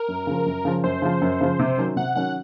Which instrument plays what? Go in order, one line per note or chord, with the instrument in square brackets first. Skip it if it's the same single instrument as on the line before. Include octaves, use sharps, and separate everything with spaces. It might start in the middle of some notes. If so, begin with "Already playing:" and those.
Already playing: [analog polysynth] A#4
[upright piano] F#2
C#3 F3
F#2
C#3 F3
[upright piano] F#2 [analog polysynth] C5
[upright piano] C#3 F3
F#2
C#3 F3
C3
D#3 F#3 C#4
[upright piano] C3 [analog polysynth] F#5
[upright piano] D#3 F#3 C#4 [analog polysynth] F#5